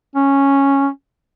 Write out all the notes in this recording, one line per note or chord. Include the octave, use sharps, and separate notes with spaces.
C#4